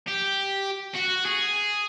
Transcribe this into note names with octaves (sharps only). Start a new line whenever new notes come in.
G4
F#4
G#4